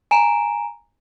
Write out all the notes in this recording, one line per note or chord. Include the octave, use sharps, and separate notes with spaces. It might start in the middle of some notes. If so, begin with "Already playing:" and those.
G#5 A#5 D7 E7